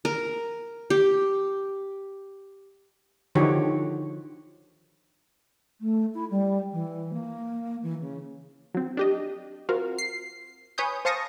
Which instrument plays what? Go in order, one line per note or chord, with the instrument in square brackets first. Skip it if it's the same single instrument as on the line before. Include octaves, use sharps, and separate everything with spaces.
[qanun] A#4
G4
[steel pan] D3 D#3 F3 F#4 G4 C#5
[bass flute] A3
E4
G3
E3
A#3
E3
C#3
[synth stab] F#3 C4
D4 G4 D#5
C4 F4 F#4 A#4
C7
B4 C#5 G#5 D#6 G6
C5 F5 A5 C#6 D#6 A#6